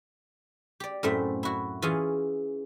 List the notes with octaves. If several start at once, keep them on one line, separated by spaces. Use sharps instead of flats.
G4 D5
F#2 A2 A3 C4 E5
E4 F#4
E3 C#4 F4 G#4